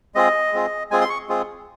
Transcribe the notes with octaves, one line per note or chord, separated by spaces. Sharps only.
G#3 C4 F4 G#4 D#5
G#3 C4 F4 G#4
G#3 C4 F4 G#4 G#5
C6
C#6
G#3 C4 F4 G#4